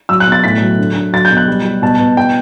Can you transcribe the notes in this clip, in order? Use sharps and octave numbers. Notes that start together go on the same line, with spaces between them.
F#3 E6
F#6
B2
A6
A2 B6
F#3
D3
D3
F#3 A6
G6
B2
F#6
G3
G3
B2 A5
B2
G5